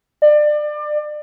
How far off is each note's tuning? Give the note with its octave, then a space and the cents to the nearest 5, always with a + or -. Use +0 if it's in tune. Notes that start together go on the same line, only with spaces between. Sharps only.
D5 +30